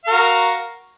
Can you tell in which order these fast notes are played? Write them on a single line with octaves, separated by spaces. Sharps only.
F5 A#4 F#4